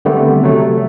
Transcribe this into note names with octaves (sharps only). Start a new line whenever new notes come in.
D3 D#3 G3 A3 B3 C4
C3 F#3 A3